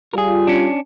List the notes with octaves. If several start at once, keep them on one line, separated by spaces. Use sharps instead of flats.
G3 F4 G#4 A#4
C#4 D4